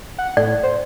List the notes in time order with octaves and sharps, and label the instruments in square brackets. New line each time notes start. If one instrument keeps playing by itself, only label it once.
[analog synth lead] F#5
[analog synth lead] A2 [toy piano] D5
[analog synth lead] C5